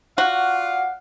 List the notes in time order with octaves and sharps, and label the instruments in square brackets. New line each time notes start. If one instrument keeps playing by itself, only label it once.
[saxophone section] F4 D5 F5 [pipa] F#4 [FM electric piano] F#5